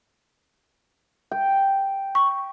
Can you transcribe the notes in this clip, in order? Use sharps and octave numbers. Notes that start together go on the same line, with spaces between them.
G5
C#6